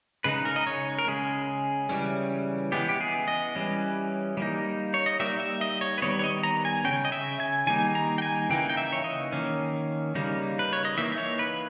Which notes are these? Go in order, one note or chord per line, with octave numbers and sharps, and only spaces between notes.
C#3 G#3 D#4 B4
A#4
D#5
C#5
A#4
C#3 G#3 C#4 G#4
C#3 E3 G3 C#4
E3 G#3 B3 G4
G4
G#4
D#5
E3 G3 C#4
G3 A#3 D#4
C#5
D#5
G3 A#3 D#4 E5
E5
D#5
C#5
B4
D#3 G3 B3 C#5
C#5
D#5
A#5
G#5
C#3 G3 C#4 G5
D#5
E5
G#5
D#3 G3 A#3 D#4 G#5
A#5
G5
G#5
C#3 E3 A#3 D#4 G5
G5
E5
C#5
D#5
D#3 A#3 C#4
C#3 G3 A#3 D#4
B4
C#5
D#5
E3 A#3 D#4 E5
C#5
B4